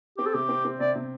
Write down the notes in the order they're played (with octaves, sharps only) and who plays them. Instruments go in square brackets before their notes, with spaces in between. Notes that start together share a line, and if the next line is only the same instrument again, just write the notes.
[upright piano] C4 [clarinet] G4
[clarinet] A4
[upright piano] C3 [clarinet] G4
[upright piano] C4
C4
[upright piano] C3 [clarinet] D5
[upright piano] C3